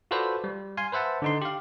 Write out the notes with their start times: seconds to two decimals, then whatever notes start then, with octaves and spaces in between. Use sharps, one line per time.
0.11 F4 F#4 A4 B4 C5 D5
0.44 G3
0.77 F5 G#5 C6
0.92 B4 C5 E5 F#5 A5
1.22 D3 D#4 C6
1.42 G4 F5